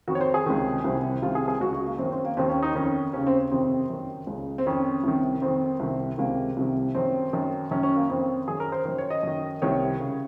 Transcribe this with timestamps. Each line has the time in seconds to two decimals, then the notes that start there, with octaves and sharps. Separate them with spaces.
0.08 F2 D#3 F#4
0.15 C#5
0.21 C5
0.34 G#4
0.46 C#2 C3 D#3
0.84 C2 C3 D#3
1.22 C2 C3 D#3 F4
1.35 G#4
1.48 G#4
1.60 C#2 C#3 F#4
1.73 F#4
1.86 A#3
1.98 F#2 D#3 C4
2.12 C4
2.25 A#3
2.37 D#2 D#3 C4
2.50 C#4
2.63 D#4
2.75 F2 D#3 C#4
3.13 D#2 C#3 C#4
3.27 C4
3.51 F2 C3 D#3 C4
3.90 F#2 D#3
4.27 C#2
4.32 C#3
4.58 C4
4.66 F2 D#3 C#4
5.04 C2 C3 D#3
5.42 F2 D#3 C4
5.80 C2 C3 D#3
6.18 C#2 C3 D#3 A#3
6.57 C2 C3 D#3
6.95 F#2 D#3 C4
7.33 F#2 D#3
7.71 F#2 D#3 C#4
7.83 C#4
7.96 A#3
8.09 F2 D#3 C4
8.48 F#2 D#3 G#4
8.60 A#4
8.72 C5
8.85 F#2 D#3 C5
8.98 C#5
9.10 D#5
9.23 F#2 D#3
9.62 C2 C3 D#3 C#5
10.00 C#3